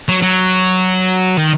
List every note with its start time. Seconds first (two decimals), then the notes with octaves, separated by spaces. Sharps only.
0.09 F#3
0.22 F#3
1.37 D#3